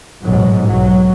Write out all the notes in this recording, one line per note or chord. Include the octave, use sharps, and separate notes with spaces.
A1 G#2 B2 F#3
B1 F#3